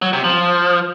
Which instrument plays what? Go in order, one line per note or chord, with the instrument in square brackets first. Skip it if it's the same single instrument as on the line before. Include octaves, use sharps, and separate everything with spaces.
[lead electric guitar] F#3
C3
F3